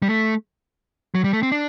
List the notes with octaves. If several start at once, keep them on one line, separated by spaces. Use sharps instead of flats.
G3
A3
F#3
G3
A3
C4
D4